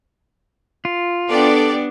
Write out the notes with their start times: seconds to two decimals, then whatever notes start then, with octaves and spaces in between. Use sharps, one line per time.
0.85 F4
1.30 B3 D4 G4 A4 D5